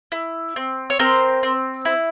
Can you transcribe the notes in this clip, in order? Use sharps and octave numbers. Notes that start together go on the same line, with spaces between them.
E4
C4
C#5
C4 A#4 C5
C4
E4